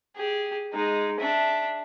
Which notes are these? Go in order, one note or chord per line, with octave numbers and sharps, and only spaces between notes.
G4 G#4
G#3 D#4
D4 E5